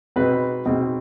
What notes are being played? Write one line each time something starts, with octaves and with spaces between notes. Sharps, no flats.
B2 G#3 C4 D#4 B4
B2 G#3 C4 D#4